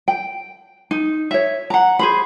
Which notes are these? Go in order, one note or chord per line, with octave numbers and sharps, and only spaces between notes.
G5
D#4
C#5 E5
F#5 A#5
G#4 C5 B5